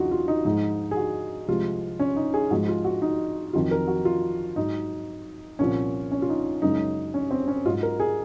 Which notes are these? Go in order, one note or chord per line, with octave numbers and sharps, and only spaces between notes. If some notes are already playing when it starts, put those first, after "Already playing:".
Already playing: D#2 C#3 F3 D#4 F4 F#4
F4
D#4
G#2 F3 G#3 D#4
G#4
F#4
C2 C3 F3 G#3 F4
C#4
D#4
G#4
G#2 F3 G#3 F#4
F4
F#4
D#4
F2 D#3 F#3 F4
A#4
F#4
F4
G#2 F#3 D#4
C2 A#2 F3 C#4
C#4
F4
D#4
F#2 C#3 G#3 D#4
C#4
C4
C#4
G#2 F#3 F4
A#4
G#4